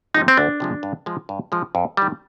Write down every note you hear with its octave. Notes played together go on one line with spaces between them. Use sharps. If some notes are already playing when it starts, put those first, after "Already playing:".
C3 F3 G#3 D#4
C4
D2 D4
C3 F3 G#3
G2
F3 G#3
G2
F3 G#3
F2
D#3 G3